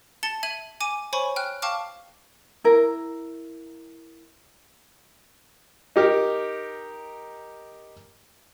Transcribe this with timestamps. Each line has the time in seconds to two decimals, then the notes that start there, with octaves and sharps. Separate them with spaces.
0.23 A5 A6 C#7 G7
0.43 E5 G#6 D#7 F#7
0.80 G#5 D6 D#7
1.13 C5 C#5 G#5 B5 C#6
1.36 G5 F6 F#6
1.62 F5 G5 A5 C#6 D6 F6
2.64 E4 A#4
5.96 D#4 G4 A#4